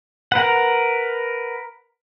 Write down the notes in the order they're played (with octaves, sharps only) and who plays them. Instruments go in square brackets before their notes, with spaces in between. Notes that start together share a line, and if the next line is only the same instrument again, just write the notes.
[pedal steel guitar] A#4 B4 F#5